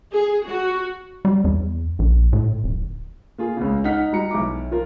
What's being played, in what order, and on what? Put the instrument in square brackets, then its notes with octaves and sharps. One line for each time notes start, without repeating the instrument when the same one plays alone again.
[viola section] G#4
F#4
[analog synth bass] G3
E2
A#1
A2
D1
[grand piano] A#3 F4 G#4
C#2 C#3
D#4 F#5 F6 B6
G3 F#4 A#5 C#7
B1 E4 D6
F3 F4 A#4